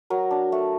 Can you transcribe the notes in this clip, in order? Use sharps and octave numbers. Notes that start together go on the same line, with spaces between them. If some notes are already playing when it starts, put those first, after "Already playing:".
F#3 A#4
D4
A3